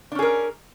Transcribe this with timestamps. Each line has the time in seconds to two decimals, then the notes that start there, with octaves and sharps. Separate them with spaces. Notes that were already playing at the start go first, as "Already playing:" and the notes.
0.12 D4
0.15 C#4
0.19 G#4
0.22 A#4